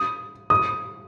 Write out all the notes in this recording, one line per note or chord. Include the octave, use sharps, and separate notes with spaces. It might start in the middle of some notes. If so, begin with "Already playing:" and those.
Already playing: D#6
D#6